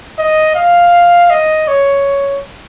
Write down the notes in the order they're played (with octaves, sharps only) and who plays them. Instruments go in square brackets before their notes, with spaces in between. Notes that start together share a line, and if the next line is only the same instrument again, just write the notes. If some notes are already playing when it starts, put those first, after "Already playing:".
[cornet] D#5
F5
D#5
C#5